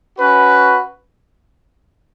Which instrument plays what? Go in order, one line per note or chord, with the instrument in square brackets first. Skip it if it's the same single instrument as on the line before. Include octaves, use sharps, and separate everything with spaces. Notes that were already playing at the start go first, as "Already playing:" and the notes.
[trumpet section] C#4 F#4 B4